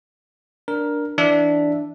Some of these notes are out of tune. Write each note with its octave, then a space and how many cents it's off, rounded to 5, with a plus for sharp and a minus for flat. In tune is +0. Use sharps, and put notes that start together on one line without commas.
D4 +0 A#4 +10
E3 +0 D4 +0 E5 +0